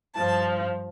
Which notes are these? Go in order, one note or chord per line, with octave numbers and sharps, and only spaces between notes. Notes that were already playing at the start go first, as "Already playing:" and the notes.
G2 F3 A5